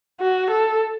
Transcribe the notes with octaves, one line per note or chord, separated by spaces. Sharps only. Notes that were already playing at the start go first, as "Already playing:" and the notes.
F#4
A4